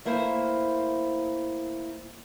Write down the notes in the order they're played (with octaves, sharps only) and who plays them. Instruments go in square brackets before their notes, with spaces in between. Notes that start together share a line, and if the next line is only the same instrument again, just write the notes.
[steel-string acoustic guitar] A3 A#3 E4 C5